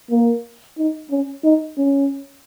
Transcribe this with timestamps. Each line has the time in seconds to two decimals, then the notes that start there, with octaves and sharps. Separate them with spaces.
0.11 A#3
0.78 D#4
1.10 C#4
1.44 D#4
1.77 C#4